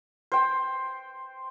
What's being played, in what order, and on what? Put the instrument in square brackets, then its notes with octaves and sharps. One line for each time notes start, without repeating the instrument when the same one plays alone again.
[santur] C5 G5